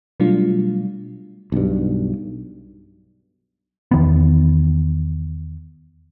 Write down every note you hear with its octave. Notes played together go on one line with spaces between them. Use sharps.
B2 F#3 G3 A3 D4 F4
B1 G2
E2 D#3 B3